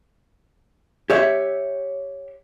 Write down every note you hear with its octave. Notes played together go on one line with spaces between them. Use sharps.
G4 C#5 E5